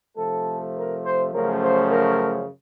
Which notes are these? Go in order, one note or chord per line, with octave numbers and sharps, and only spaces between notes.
C3 F3 A3 A4
A#4
C5
F#2 C#3 F3 A3 A#4
C5
A#4